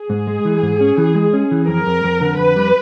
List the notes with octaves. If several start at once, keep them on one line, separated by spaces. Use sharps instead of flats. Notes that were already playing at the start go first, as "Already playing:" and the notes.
Already playing: G#4
G#2
G#3
E3
G#2
C#4
E3
G#3
C#4
E3
F2 A#4
F2
F2
D3
F2 B4
G3